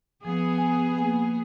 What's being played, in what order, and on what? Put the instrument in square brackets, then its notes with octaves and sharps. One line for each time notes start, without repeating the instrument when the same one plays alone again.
[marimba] F3 [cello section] B3 G#4
[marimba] G#5
A#3 G#5